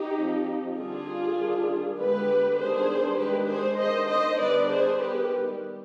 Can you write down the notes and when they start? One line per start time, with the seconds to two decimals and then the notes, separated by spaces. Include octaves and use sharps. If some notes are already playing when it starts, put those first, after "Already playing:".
Already playing: D#4 G4
0.17 F3 C4
0.77 D3 G3 D4 F4 G#4
1.37 D#3 G3 D4
1.98 D3 G#3 B3 G4 B4
2.58 D#3 G3 B3 D4 G#4 C5
3.18 D#3 G#3 D4 G4 B4
3.48 G#4 C5
3.79 D#3 B3 D4 C5 D#5
4.09 C5 D#5
4.39 D3 G3 B3 D4 B4 D5
4.69 G#4 C5
4.99 D#3 G3 B3 G4 B4